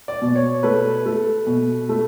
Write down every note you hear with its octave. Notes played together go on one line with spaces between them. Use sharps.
D5
B2
C#5
A3 B4
A3
B2
A3